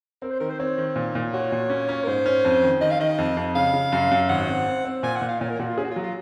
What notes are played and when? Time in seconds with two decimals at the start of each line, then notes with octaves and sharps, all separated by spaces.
0.22 C4 A#4
0.31 C5
0.40 D#3 A#4
0.50 C5
0.59 C4 C#5
0.78 D#3
0.96 A#2
1.15 A#2
1.33 F#4 C#5
1.52 A#2
1.70 C#4
1.89 C#4
2.04 A#4
2.07 G#2 C5
2.26 C#4
2.45 F2
2.63 D#3
2.81 D#3 D#5
2.91 F5
3.00 D#3 D#5
3.18 F2
3.37 F2
3.55 C#3 F5
3.74 C#3
3.92 F#2
4.11 F#2
4.29 G#1 F#5
4.48 C4
4.66 C4
4.85 C4
5.03 A#2 G#5
5.16 F#5
5.22 A#2
5.28 F5
5.40 A#2 C#5
5.49 A#4
5.59 A#2 F#4
5.69 F4
5.77 C#4 G#4
5.84 F#4
5.91 F4
5.96 F#3
6.03 F4